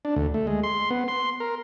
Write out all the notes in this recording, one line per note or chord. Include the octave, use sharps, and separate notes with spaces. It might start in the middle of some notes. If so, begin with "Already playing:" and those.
D4
D2
A3
G#3
C6
B3
C6
A#4